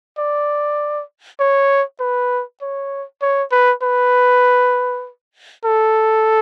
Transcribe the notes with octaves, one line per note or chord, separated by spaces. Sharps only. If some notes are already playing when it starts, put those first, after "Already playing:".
D5
C#5
B4
C#5
C#5
B4
B4
A4